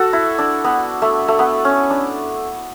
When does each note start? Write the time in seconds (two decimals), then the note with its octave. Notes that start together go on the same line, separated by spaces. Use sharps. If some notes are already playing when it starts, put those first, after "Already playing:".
Already playing: F#4 A4
0.13 E4
0.38 D4
0.64 B3
1.02 A3
1.28 A3
1.39 B3
1.65 C#4
1.90 D4